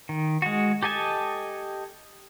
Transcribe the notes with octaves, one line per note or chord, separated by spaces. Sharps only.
D#3
G#3 F#4
G4 A4 D#5 G#5 A5